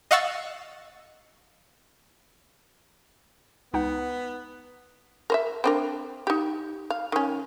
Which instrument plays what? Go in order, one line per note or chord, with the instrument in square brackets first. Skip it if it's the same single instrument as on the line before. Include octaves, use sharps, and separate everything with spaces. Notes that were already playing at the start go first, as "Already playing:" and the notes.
[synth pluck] D#5 F5 F#5 C#6 E6 A6
[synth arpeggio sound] C#2 D#4 F#5 [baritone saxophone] B3
[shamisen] A#4 C5 E5
C4 D4 A#4
D#4 G4
F5
D#3 C#4